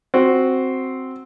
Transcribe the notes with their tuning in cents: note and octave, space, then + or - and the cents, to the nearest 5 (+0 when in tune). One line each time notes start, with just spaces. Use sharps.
C4 +0 F#4 +0